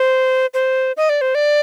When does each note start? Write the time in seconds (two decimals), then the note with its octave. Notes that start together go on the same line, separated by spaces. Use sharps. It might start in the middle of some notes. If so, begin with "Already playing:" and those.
Already playing: C5
0.54 C5
0.97 D#5
1.09 D5
1.21 C5
1.35 D5